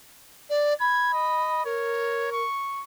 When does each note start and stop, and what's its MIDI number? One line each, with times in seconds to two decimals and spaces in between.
0.50 0.74 74
0.80 1.62 83
0.80 1.08 92
1.13 1.60 75
1.65 2.42 70
1.65 2.29 73
2.32 2.83 85